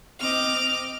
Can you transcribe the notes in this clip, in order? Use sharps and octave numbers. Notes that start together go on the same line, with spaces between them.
C4 D#5 D6 F6